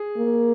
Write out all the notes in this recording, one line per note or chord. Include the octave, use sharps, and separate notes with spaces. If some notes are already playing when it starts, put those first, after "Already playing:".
Already playing: G#4
A#3